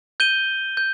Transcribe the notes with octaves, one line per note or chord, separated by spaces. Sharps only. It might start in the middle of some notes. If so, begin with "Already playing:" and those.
G6 D#7 G7
G6